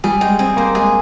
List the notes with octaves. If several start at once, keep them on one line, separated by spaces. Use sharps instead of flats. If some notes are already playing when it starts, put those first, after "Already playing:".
G3 G#4
G#3 G5
C4 G#4
A#3 C5
G#3 G#4